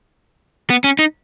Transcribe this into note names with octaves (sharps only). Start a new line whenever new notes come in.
B3
C#4
D#4